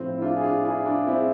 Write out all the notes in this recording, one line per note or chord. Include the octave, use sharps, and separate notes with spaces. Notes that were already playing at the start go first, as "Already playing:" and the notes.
Already playing: A2 F3 C4
E4
D4 F4
G#4
D4 F4
E4 G#4
D4 F4
C4 E4